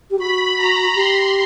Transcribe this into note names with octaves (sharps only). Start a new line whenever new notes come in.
G4
F#4 B5
A#5
G4 C6